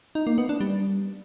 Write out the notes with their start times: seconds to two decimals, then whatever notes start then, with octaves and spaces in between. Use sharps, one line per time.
0.15 D#4
0.27 A#3
0.38 B3
0.49 D4
0.61 G3